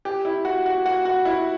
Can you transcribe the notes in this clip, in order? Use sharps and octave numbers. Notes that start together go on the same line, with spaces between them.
G4
E4
F#4
F#4
F#4
F#4
E4